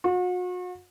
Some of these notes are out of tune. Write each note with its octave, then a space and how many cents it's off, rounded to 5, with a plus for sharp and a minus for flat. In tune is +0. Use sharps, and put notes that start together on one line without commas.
F#4 -40